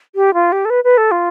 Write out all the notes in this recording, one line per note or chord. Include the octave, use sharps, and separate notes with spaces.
G4
F4
G4
A4
B4
B4
A4
F4